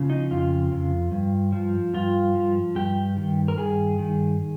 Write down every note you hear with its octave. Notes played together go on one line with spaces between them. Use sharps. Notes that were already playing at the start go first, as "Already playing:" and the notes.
Already playing: C#3 F3
D#4
F2 F4
F2
G2
F3
G2 F4
F3
G2 G4
D#3
A#4
G2 G#4
D#3